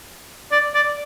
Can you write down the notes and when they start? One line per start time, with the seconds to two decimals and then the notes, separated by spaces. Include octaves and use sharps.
0.52 D5
0.74 D5